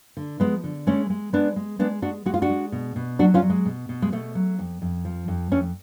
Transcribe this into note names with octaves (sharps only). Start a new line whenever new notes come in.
D3
F3 G#3 B3
D3
G#3 A3 C#4
G#3
G#3 B3 D4
G#3
G#3 B3 D4
G#3 D4 F#4
G#3 F#4
F4
D4 F#4
G#3
B2
B2
F#3 D4 F#4
C#4 F4
F#3
G#3
B2
B2
G#3
B2 A3
F#3
F2
F2
F3
F2
F2 A3 C#4